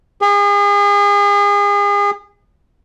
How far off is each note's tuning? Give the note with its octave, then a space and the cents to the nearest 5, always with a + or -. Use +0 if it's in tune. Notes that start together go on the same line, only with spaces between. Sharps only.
G#4 -35